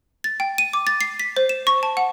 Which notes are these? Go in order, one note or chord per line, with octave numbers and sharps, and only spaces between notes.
A6
G5
D#7
D6
A6
C7
B6
C5
E7
C#6
A5
F#5